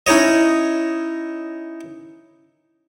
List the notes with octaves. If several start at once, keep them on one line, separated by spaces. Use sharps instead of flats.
C#4 D#4 E4 C#5 D#5